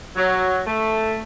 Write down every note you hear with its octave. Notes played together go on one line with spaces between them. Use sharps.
F#3
A3